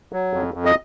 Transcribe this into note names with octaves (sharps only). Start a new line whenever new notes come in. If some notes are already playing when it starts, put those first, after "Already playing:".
F#3
F2
F2
D#5